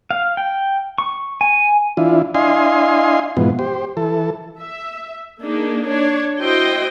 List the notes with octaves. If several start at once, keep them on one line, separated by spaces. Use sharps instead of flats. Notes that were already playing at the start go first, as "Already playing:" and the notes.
F5
G5
C#6
G#5
E3 D4 E4 F4
D4 E4 D#5 F5 G#5 C6
G#2 B2 E3 F3 B3
G4 C5
E3 A4
E5
A#3 D4 D#4 G#4
D4 C#5
E4 F#4 C5 D#5 G5 C6